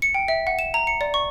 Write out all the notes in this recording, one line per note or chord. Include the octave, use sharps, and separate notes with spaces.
C#7
G5
E5
F#5
E7
A#5
C#7
D5
C#6